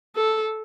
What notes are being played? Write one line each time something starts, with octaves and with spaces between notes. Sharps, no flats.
A4